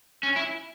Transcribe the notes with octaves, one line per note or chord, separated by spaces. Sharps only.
C#4
E4